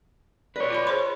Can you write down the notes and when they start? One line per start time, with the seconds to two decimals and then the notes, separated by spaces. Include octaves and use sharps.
0.56 B4 C#5 D5
0.70 F4 D5 B5
0.87 G#4 C5 C6